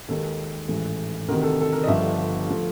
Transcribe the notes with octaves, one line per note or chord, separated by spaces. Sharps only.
D#2 D#3 G#3 A4
A1 G#2 E3 A3
D2 C3 D#3 A#4
A4
A4
A#4
D#5
G1 G2 D3 F3 E5
F3 A3